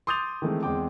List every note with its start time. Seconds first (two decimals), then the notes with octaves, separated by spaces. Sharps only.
0.07 C6 D6 D#6 G6 A6 F7
0.42 D#3 E3 G#3 A3 C4
0.63 E2 G#3 C4 G5 D6